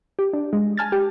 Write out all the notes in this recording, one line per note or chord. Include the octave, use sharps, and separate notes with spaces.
G4
D4
G#3
G#5 A5 F6 G#6 A6
G4